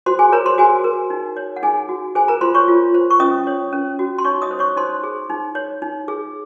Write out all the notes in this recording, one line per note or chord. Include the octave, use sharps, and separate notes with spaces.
F#4 C5 C6
G#4 G#5
A#4 C#5 A#5
C5 C6
F#4 G#4 G#5
A#4
D#4
C#5
F#5
D#4 G#4 G#5
F#4
G#4 C5 G#5
A#4 A#5
F4 C5 C6
C#5 C#6
F4
C5
C#6
C#4 D#5 D#6
C#5
C#4
F#4
C6
D#4 C#5 C#6
D#5 D#6
C5
C#5 C#6
D#4 C5 C6
G#4
D#4
C#5
D#4
G#4